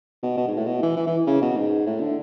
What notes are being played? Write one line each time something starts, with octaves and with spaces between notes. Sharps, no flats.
B2
B2
G#2
A2
B2
E3
E3
E3
C#3
B2
G#2
A2
D3